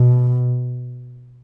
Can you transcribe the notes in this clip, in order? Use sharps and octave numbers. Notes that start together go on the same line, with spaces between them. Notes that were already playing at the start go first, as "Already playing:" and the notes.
Already playing: B2